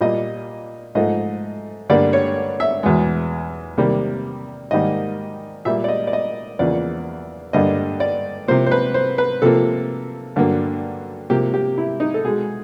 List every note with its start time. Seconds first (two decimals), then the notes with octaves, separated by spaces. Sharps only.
0.01 A#2 G3 A#3 D#5
0.95 G#2 F3 A3 D#5
1.90 G2 D3 G3 A#3 D5
2.13 C#5
2.60 E5
2.83 E2 B2 G#3
3.77 C3 D#3 G3 A#3
4.71 G#2 D#3 G3 A#3 D#5
5.65 A#2 G3 A#3 E5
5.84 D5
5.88 D#5
6.07 D5
6.13 D#5
6.59 E2 C#3 F3 A#3 D5
7.53 G2 D3 G3 A#3 D#5
8.00 D5
8.48 C3 F3 A#3 C5
8.67 C5
8.71 B4
8.94 C5
9.18 B4
9.42 C3 F3 A#3 A4
10.36 G2 D3 F#3 A#3
11.30 C3 F3 A#3 G4
11.54 G4
11.78 E4
12.00 D#4
12.14 A4
12.24 B2 G#3 G#4